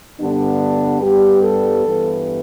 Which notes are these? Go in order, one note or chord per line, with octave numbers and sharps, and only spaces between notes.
G2 D3 G3 B3 D4
G2 G3 B3 G4
A4
G2 E3 B3